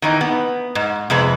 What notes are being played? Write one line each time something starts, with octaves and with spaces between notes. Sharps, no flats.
D#3 E3 D#4
B3
G#2
F2 C3 G#3 B4